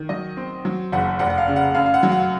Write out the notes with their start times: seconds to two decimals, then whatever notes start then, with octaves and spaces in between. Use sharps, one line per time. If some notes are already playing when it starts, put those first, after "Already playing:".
Already playing: D#3
0.09 F#3 D#5
0.37 C4
0.65 F#3
0.92 F#1 F#5
1.19 F1 F#5
1.30 F#5
1.38 F5
1.48 C#3
1.56 F#5
1.75 F#2 F5
1.86 F5
1.94 F#5
2.03 F#3
2.12 F#5